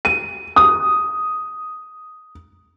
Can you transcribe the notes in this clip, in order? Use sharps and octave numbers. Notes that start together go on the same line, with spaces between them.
D#7
D#6